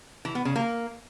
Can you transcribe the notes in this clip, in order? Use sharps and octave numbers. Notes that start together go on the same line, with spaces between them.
E3
B3
C#3
A#3